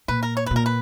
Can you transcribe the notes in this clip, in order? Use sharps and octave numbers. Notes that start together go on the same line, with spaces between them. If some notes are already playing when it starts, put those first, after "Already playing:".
A#2 B4
A#4
C#5
B4
A#2
A#4
B4